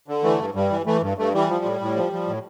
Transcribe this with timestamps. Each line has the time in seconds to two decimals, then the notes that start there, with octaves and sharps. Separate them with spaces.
0.08 D3
0.23 E3 A3
0.39 G2
0.54 G2 G3
0.71 E3
0.86 E3 A3
1.02 G2
1.18 G2 A3
1.34 E3 G3
1.49 F3
1.65 A2
1.81 A2
1.96 F3
2.12 F3
2.28 A2